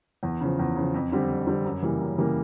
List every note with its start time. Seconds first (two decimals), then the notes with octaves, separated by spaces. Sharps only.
0.23 E2
0.41 C#3 F3
0.59 E2
0.76 C#3 F3
0.94 F2
1.12 D3 G3 C4
1.30 F2
1.46 D3 G3 C4
1.64 F#2
1.82 C#3 E3 G3 A#3
2.00 F#2
2.18 C#3 E3 G3 A#3